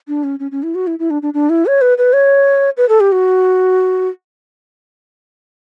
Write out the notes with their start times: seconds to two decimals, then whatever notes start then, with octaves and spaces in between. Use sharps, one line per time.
0.08 D4
0.24 C#4
0.39 C#4
0.51 C#4
0.63 E4
0.75 F#4
0.87 E4
0.99 E4
1.10 D4
1.22 D4
1.34 D4
1.50 E4
1.66 C#5
1.81 B4
1.98 B4
2.13 C#5
2.77 B4
2.89 A4
3.00 G4
3.12 F#4